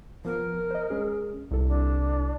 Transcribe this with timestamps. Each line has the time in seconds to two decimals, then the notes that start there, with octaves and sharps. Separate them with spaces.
0.25 F3 B3 A#4
0.71 C5 D#5
0.90 G#3 C#4 G#4
1.51 C2 A4
1.67 D4